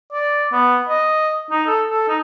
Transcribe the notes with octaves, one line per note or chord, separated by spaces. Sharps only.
D5
B3
D#5
D#4
A4
A4
D#4